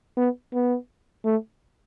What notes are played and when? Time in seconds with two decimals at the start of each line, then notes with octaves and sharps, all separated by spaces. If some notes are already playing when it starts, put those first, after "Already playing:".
0.17 B3
0.54 B3
1.25 A3